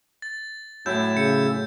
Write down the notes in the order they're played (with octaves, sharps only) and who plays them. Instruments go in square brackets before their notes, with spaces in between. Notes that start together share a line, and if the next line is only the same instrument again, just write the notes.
[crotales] A6
[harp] F#2 A2 [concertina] E4 E6 [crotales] G6
[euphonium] C#3 [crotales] C#7